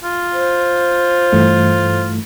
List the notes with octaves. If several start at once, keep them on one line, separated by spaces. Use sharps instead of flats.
F4
C5
G2 E3 A3